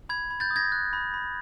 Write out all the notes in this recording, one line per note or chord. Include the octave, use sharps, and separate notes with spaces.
B5 G#6
B5
G6 A6
D#6
G#6 A#6
F#6
B5
B5